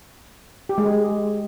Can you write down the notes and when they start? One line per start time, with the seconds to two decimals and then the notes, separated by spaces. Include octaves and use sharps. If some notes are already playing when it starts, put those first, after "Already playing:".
0.69 G4
0.78 G#3
0.86 G#4